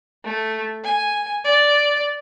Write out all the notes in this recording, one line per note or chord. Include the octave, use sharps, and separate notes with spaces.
A3
G#5
D5